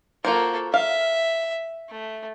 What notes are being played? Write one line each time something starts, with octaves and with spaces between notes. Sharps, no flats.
A#3 F4 F#4 A4 C5
E5 F5
A3